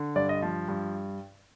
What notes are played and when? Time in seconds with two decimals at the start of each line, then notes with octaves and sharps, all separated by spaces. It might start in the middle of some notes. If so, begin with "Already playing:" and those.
Already playing: D3
0.16 G2 D5
0.29 D#5
0.42 F3
0.68 G2